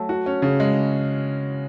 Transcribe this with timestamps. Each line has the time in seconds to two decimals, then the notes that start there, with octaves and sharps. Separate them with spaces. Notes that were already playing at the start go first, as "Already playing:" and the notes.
Already playing: F#3 A3
0.09 F#4
0.26 C#4
0.42 C#3
0.60 G#3